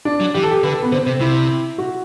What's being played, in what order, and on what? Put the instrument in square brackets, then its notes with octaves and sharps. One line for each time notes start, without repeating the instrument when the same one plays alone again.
[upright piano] D4
[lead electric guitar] F#3
[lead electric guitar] E3 [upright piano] G4
[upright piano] A4
G4
[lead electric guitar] D3 [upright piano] B4
[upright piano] A4
B3
[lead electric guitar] D3 [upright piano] C4
[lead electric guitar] C3
[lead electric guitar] C3 [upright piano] E4
[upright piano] F#4